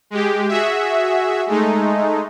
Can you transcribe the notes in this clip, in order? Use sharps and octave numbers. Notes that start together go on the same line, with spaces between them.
G#3 G4
F#4 G#4 E5
G#3 A3 D#4